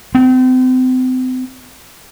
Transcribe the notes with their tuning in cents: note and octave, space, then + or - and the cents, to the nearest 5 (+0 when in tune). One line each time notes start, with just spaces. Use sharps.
C4 -35